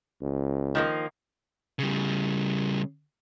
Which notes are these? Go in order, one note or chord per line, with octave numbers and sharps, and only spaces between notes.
C#2
D#3 F3 A#3
C#3 G3